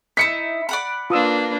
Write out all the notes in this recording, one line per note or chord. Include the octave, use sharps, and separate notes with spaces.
D#4 E4 B6 C#7
D5 F#5 B5
A#3 D4 F4 B4 D#6 E6